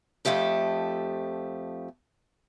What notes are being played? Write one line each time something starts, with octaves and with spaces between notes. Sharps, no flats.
F2 F3 A3 G4 A4